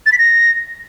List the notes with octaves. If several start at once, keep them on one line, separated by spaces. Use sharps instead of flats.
A6
B6
A#6